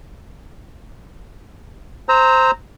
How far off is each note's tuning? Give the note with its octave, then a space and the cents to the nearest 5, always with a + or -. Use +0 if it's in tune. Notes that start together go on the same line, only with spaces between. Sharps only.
C5 +0 A#5 -10 E6 -30